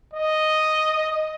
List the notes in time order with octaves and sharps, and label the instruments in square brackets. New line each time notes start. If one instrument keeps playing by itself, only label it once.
[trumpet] D#5